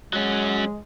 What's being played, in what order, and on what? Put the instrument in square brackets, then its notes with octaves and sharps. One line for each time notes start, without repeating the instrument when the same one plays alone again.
[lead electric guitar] F#3 C#4 [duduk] G#3